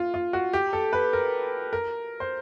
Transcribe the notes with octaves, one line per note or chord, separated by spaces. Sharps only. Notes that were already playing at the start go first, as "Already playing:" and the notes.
Already playing: F4
F4
F#4
G4
A4
B4
A#4
A#4
C5